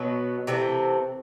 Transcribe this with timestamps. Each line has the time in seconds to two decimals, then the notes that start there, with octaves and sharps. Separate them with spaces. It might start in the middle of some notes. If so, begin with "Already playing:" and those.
Already playing: B2 F#3 B3
0.47 C3 E3 A3 C4